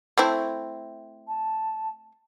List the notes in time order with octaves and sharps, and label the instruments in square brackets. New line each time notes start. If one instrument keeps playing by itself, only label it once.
[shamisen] A3 C4 E4
[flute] A5